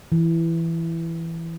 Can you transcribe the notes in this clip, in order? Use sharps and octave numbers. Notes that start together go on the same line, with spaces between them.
E3